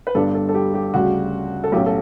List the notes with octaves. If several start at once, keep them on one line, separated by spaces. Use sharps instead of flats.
B4
G1 G2 D3 G3 D4 A4
A4
A4
G4
G4
D2 C#3 G3 F#4
A4
B1 A2 F#3 C#4 G4
A4